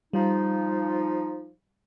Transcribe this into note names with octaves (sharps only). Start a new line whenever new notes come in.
F3 G3 D#4